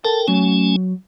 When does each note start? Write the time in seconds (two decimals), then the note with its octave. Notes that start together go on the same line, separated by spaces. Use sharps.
0.05 A4 A#4 G5 A5
0.28 F#3 A3 C#4 G#5